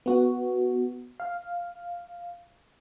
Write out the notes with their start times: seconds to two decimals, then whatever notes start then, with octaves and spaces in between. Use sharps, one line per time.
0.06 B3 F#4
1.20 F5